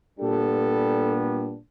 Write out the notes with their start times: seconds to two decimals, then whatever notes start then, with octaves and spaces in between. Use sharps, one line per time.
0.18 A#2 G3 B3 D4 G4 A4